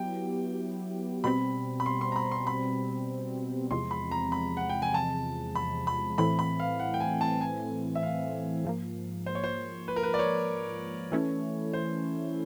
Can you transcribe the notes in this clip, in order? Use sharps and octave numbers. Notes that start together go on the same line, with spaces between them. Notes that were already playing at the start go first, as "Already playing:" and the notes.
Already playing: F#3 B3 E4 G4 G5
B2 G3 C4 B5
B5
C6
C6
A#5
B5
C6
B5
E2 C3 F3 G#3 C4 C6
B5
A#5
B5
F#5
G5
G#5
A5
B5
B5
A2 E3 A3 C4 B5
B5
F5
F#5
G5
G#5
A5
G#5
E5
F5
G#2 F3 A#3
C5
C#5
C5
B4
A#4
B4
D5
C#5
E3 A3 C#4 E4
C5